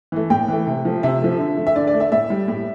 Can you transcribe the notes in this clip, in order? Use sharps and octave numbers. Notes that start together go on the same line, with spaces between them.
E3 A3
A2 G5
E3 A3
C3
F3 A3
C3 E5
F3 A3
D3
A3
E5
D3 D5
D5
A3
E5
A2 E5
G3
A2